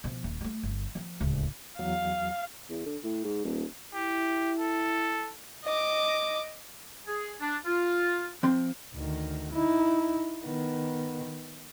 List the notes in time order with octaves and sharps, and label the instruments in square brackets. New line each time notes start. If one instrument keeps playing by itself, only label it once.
[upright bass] B2 F3
D#1
G3 A3
G1
F3 C4
D1 C#2
[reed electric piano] E2 F#3 [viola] F5
[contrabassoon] E2
D3
A2
G#2
D#1
[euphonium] E4 [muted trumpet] G4
[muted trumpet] A4
[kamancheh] D#5 D6
[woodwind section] G#4
D4
F4
[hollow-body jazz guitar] F3 C4 C6
[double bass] D2 D#3
D#4 E4
D#3 B3